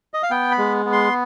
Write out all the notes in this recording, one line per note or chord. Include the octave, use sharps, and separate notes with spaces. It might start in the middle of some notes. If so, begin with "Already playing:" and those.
D#5
F5
B3 G5
B5
G#3
B3
C6